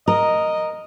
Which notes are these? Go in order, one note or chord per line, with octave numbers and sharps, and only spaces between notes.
A#4 D#5